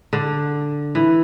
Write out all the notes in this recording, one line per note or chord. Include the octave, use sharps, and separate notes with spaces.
D3
E3